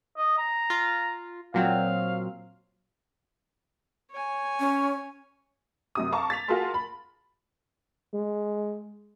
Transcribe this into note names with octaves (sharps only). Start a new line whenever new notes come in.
D#5
A#5
F4
A#2 F#3 C4 F5
C#5 G#5
C#4
F#2 C3 D#6
F5 A5 A#5 C#6 D6
A6 B6 F7
F4 F#4 G#4 A#4 A5 C6
B5
G#3